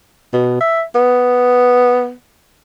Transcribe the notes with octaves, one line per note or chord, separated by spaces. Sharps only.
B2
E5
B3